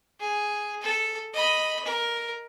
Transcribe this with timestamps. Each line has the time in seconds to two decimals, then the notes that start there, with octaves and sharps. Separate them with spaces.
0.20 G#4
0.81 A4
1.33 D#5 B5
1.85 A#4